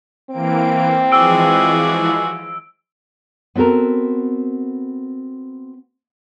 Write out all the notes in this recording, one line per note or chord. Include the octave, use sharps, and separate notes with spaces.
E3 A#3 C4 D7
E3 F3 G#3 F#4 G#4 D5 E6 D7
B3 C4 F#4 A4 A#4